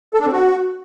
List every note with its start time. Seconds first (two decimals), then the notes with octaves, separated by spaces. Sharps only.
0.14 A4
0.20 D4
0.26 C4
0.32 F#4